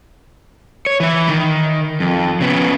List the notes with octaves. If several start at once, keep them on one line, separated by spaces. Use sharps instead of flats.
C#5
E3 E4
D#3
F2
C#3 B3